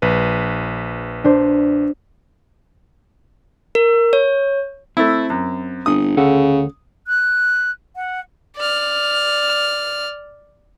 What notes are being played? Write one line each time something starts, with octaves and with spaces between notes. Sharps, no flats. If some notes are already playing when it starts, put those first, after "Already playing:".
A#1 B4
D4 C5
A#4
C#5
A3 C4 E4
F#2
G1 D#6
D2 C#3 A4 F#5
F#6
F#5
D5 F6